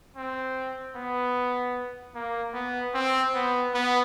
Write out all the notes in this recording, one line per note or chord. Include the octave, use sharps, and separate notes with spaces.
C4
B3
A#3
B3
C4
B3
B3